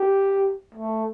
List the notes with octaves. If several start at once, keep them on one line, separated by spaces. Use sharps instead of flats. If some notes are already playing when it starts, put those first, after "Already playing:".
Already playing: G4
A3